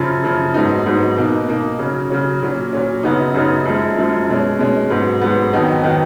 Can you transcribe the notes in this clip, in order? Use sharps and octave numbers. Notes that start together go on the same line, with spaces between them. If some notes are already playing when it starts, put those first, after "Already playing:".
Already playing: F#2 C#3 F3
F#2 C#3 F3
G#2 F#3 B3 D#4
G#2 F#3 B3 D#4
B2 A#3 D#4
B2 A#3 D#4
C#3 F#3 C#4
C#3 F#3 C#4
A#2 F#3 C#4
A#2 F#3 C#4
F#2 C#3 F#3 B3 D#4
F#2 C#3 F#3 B3 D#4
F#2 F3 G#3
F#2 F3 G#3
B2 G#3 C#4
B2 G#3 C#4
G#2 F#3 B3
G#2 F#3 B3
F2 D#3 F#3 B3 D#4
D#3 F#3 B3 D#4